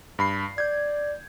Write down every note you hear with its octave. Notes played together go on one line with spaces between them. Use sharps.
G2 B5 C7
D5 G6 G#6